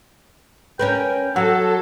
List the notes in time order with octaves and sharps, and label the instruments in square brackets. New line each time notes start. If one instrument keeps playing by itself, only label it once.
[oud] C#4 A#4 B4 [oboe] G5
[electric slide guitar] F#3 [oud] F#4 [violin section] A4 [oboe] E6